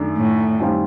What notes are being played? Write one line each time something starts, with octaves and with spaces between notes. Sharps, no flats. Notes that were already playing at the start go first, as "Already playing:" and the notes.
Already playing: F#2 D#3 F#3 A3 D4
A2
F#2 D#3 G3 C4 F4